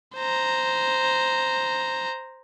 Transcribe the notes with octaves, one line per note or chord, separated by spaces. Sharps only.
C5 A#5